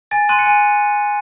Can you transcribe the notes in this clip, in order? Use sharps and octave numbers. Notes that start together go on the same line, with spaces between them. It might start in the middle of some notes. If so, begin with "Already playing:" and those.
G#5 A6
C6 F#6 D#7
C#7
G#5 D#7